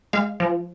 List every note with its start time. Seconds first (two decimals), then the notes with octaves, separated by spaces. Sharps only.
0.13 G#3 F5
0.40 F3